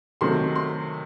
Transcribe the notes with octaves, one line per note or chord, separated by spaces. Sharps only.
C3 D#3 F#3 A3 C6
C6